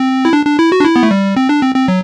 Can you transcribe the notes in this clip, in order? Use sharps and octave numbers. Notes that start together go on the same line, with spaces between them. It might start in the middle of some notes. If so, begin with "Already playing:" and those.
Already playing: C4
E4
D4
D4
E4
F#4
D4
E4
B3
A3
G3
C4
D4
C4
C4
F#3